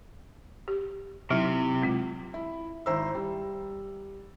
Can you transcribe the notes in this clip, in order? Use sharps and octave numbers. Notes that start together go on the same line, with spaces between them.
G4
C3 F#3 D#4 E4
G#3 C4 F4
E4
G#1 E4 C5 A#5 E6
G3